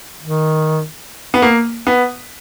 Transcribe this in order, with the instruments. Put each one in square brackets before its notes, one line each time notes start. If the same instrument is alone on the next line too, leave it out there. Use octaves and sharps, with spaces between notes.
[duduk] D#3
[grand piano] B3
A#3
B3